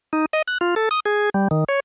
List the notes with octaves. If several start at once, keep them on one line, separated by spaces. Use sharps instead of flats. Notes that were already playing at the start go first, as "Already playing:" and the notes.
D#4
D#5
F#6
F4
A4
D#6
G#4
G3
D#3
C#5